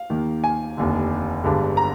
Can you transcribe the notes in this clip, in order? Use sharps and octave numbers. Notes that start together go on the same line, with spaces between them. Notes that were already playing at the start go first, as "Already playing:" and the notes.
Already playing: F5
D#2 D#3 A#3
G#5
F1 D#2 D3
G1 G2 D3 G#3
A#5